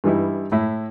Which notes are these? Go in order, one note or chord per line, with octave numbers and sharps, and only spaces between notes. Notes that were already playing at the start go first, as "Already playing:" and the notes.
G2 E3 G3 D#4 E4
A2 E4